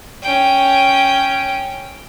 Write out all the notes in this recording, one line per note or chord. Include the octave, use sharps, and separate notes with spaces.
C#4 G5